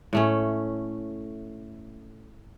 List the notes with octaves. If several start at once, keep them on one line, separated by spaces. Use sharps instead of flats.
A2 A3 C#4